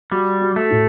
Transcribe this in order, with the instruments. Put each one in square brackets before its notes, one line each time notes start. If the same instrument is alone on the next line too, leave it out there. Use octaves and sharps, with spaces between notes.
[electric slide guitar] G3 [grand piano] F#4
[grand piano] F#4
[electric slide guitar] A3
[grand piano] A2